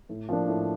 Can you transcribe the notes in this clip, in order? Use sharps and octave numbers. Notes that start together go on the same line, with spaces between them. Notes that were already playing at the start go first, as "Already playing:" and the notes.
A2
F3 A#3 D4
A2